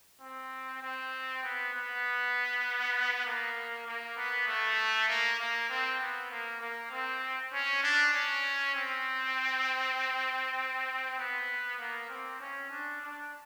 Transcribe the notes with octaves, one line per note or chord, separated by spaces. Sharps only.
C4
C4
B3
B3
A#3
A#3
B3
A3
A#3
A#3
C4
B3
A#3
A#3
C4
C#4
D4
C#4
C4
B3
A#3
C4
C#4
D4
D4